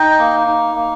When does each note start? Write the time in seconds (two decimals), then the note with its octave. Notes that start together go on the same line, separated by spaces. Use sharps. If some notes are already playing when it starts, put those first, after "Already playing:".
Already playing: D#4 D#5 G5
0.19 A#3
0.47 D#4
0.75 A#3